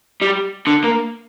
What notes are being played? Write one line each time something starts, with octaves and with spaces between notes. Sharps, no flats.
G3
D3
A#3